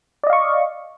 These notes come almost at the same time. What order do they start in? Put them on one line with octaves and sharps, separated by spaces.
D5 D#5 F5 C#6